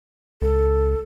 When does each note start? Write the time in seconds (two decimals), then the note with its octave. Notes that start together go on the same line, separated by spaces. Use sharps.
0.42 C#2 A4